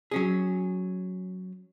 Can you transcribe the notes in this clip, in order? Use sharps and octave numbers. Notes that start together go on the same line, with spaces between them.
F#3 C#4 G#4